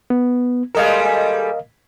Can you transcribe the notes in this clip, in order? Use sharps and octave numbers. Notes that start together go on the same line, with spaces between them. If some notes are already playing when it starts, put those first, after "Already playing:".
B3
G3 G#3 A4 A#4 D#5 F5